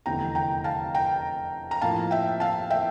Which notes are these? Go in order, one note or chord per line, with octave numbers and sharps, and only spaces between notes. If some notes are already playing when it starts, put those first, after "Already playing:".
F1 E2 D3 G5 A#5
G5 A#5
F5 A5
G5 A#5
A#5
A2 F3 A#3 F5 A5
E5 G5
F5 A5
E5 G5